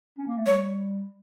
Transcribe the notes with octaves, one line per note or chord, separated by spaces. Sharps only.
C#4
A#3
A3
G3 C#5